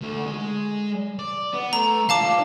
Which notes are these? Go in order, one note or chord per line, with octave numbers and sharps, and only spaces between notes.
D2 A3
G#3
D5
B3
A3 A#5
F3 D4 F5 A5 D6